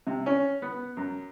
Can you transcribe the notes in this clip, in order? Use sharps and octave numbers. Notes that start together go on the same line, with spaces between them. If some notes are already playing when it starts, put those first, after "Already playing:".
C3
C#4
B3
F#2